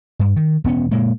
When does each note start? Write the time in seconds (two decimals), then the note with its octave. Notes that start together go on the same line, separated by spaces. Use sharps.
0.19 G2
0.36 D#3
0.64 E1 B3 C#4
0.91 A#2 G#3 A#3